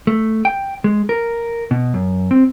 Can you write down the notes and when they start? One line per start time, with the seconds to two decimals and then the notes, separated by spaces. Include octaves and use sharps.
0.07 A3
0.45 G5
0.84 G#3
1.09 A#4
1.71 B2
1.94 F#2
2.31 C4